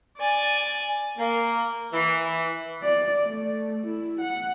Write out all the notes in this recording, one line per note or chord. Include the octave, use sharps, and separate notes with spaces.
D5 G#5 A6
A#3
E3
D5
A3
E4
F#5